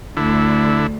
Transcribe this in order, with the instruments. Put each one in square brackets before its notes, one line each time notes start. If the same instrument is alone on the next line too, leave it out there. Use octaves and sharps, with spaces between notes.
[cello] D2 [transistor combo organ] D3 E4